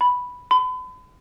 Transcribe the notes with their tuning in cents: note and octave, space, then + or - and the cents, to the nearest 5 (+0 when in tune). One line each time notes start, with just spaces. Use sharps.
B5 +0
B5 +40